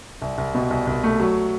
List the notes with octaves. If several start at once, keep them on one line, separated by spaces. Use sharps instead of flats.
C2
C2
B2
C2
C2
A3
F#3